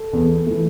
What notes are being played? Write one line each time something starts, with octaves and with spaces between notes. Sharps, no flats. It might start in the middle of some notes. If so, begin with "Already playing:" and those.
Already playing: A4
E2
E3 A3